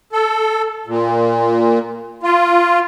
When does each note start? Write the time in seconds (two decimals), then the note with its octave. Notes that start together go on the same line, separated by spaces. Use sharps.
0.13 A4
0.87 A#2
2.23 F4